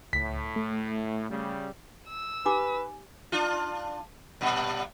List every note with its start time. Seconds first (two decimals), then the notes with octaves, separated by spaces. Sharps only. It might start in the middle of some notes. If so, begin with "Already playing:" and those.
0.13 C#2 A2 B6
0.56 A3
1.29 C#3 G3
2.08 E6
2.46 D#4 G4 B4 G#5 D6
3.32 D4 F4
4.41 G2 A#2